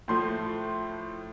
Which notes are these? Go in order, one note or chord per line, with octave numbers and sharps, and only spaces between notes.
A2 F3 A3 C6